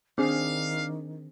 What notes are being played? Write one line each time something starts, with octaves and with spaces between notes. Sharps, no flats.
D#3 C4 D4 G#4 F5